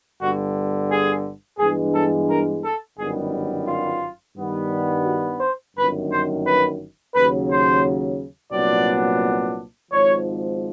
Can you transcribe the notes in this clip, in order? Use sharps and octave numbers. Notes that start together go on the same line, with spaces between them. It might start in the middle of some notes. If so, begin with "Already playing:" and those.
G1 G2 D3 F#4
G#4
G2 E3 G#3 B3 D4 G#4
A4
A#4
A4
G1 F#2 D#3 G3 B3 G#4
F4
G2 D#3 G3 B3 D4
F#4
C5
G1 F#2 D#3 B4
C5
B4
D#2 C#3 F#3 B4
C5
C2 A#2 F#3 B3 D4 D5
G#1 G#2 F3 C#5